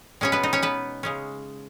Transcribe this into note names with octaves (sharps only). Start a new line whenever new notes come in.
B2 G#3 B3 C#4 C#5
B3 B4
D#4
C#4 C#5
B3 B4
C#3 G#3 C#4